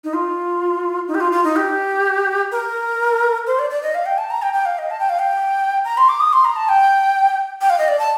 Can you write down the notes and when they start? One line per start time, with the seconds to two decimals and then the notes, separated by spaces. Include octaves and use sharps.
0.04 D#4
0.13 F4
1.08 D#4
1.14 G4
1.20 F4
1.32 F4
1.44 D#4
1.56 G4
2.52 A#4
3.47 C5
3.59 D5
3.70 D5
3.83 D#5
3.94 F5
4.06 G5
4.18 A5
4.30 A#5
4.42 G5
4.53 G5
4.65 F5
4.78 D#5
4.90 A5
4.99 G5
5.09 F5
5.19 G5
5.85 A#5
5.97 C6
6.09 D6
6.20 D#6
6.33 C6
6.45 A#5
6.56 A5
6.68 G5
7.61 G5
7.70 F5
7.78 D#5
7.88 D5
7.99 A5